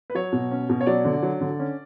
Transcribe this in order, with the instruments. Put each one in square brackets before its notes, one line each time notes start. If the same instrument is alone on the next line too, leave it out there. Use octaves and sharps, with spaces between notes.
[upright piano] B4
F#3 C#5
B2
C#4
B2
C#5
F#3 D5
D3
F#3
D3
C#4